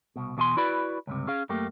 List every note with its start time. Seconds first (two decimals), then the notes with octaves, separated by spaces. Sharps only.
0.16 C2 B2
0.37 E2 B2 F4 G#5 C6
0.57 E4 F#4 B4 D5 B5
1.07 C#2 G2 C3
1.27 C#4 G#4 F5
1.49 F#2 A3 A#3 G4